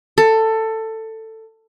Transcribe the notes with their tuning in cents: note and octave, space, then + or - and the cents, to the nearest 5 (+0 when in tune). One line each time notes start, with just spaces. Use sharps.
A4 +15